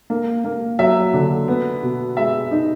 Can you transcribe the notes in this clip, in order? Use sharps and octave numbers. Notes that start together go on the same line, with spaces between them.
A#3
A#3
F#3 E5
D3
B3
B2
G#3 E5
D#4